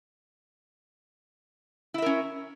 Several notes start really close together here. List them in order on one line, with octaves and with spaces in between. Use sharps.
E4 E5 A#4 C#4